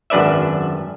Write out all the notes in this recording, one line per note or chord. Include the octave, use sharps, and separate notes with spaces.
G#1 F#2 D4 B4 D5 E5